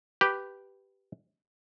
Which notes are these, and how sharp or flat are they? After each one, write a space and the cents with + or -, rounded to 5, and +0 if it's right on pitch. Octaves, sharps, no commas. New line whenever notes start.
G4 -5 B4 +0